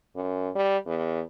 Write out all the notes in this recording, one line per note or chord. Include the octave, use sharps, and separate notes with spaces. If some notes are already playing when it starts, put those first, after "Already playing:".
F#2
G3
E2